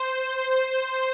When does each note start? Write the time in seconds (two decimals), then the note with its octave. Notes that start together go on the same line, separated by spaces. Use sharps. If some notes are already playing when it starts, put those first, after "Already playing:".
Already playing: C5